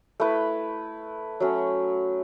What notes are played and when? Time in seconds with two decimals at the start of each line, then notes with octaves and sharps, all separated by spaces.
0.20 A3 E4 B4
1.40 F#3 A3 C#4